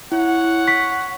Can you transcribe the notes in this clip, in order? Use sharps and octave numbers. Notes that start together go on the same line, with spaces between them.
E4 C#5 F#5
C#6 B6